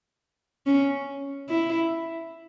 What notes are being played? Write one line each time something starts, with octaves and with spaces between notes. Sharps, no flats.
C#4
E4